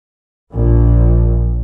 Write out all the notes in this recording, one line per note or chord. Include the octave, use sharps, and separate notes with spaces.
A#1